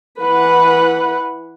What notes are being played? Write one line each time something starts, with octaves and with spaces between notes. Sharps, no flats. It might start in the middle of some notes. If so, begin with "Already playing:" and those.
E3 B4 F#5